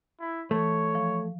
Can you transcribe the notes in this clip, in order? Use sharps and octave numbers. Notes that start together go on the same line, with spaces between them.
E4
E3 A3 C#5
F3